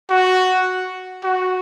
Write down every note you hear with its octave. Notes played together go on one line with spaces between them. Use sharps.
F#4
F#4